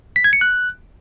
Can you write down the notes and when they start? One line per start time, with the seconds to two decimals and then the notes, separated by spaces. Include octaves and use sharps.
0.16 B6
0.24 G#6
0.33 C#7
0.41 F#6